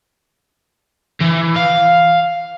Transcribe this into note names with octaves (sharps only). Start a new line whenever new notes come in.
E3
F5